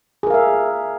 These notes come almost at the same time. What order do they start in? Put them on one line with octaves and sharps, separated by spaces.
G#4 A#4 F5 E5